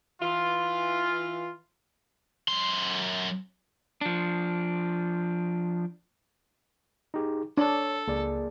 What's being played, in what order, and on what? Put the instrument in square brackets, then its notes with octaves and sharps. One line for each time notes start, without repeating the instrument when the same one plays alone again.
[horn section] E3 F4
[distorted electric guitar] F#2 C6
[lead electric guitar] F3 D4
[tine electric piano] D#4 G4 G#4
[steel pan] D4 [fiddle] A4 [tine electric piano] C#5
[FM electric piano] C#2 [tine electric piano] A#3 G#4 D5